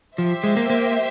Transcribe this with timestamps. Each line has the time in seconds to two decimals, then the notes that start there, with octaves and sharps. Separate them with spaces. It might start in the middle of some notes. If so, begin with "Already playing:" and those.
0.18 F3 G4 C5 E5
0.44 G#3
0.57 A#3
0.70 A#3